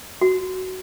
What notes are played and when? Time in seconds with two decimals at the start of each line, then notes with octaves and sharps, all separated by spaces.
0.21 F#4